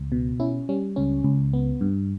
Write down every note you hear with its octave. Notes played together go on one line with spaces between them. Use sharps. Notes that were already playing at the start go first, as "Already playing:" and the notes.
Already playing: C#2
B2
C#4 E4
G3 C#4
C#2 C#4
C#2
B3
G2